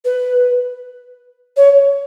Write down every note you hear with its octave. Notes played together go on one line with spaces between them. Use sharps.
B4
C#5